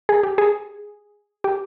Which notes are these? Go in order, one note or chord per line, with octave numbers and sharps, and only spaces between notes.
G#4
G4
G#4
G4